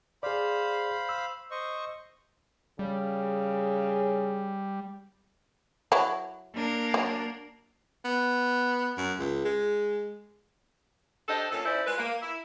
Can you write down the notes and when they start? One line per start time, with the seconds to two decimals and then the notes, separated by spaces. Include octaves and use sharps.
0.23 G#4 C5 D5 F5 B5
1.09 E6
1.51 C5 D#5 C#6
2.79 C#3 G3
5.92 F#3 E4
6.54 A#3 D4 A#4
6.94 F#3
8.05 B3
8.97 F#2
9.19 C#2
9.45 G#3
11.28 D4 G4 A4 C5 D#5
11.52 A#2 C#4 A4
11.66 C#4 D#4 E4 C5 D5
11.86 G#3 F4 B4
11.99 A#3
12.21 E4